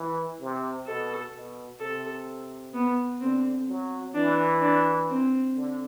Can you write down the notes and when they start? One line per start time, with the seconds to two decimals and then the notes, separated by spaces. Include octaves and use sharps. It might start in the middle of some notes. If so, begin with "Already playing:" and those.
Already playing: E3
0.40 C3
0.87 B2 A4
1.34 B2
1.80 C3 A4
2.74 B3
3.21 D3 C4
3.68 F#3
4.15 E3 D4
4.62 D4
5.09 C4
5.56 D3